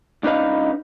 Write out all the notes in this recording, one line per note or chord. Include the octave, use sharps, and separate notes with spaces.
C#2 D4 D#4 B4 F5